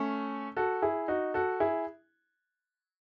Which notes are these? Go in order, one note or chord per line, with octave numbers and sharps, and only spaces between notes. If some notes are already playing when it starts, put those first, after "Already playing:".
Already playing: A3 C#4
F#4 A4
E4 G#4
D#4 F#4
F#4 A4
E4 G#4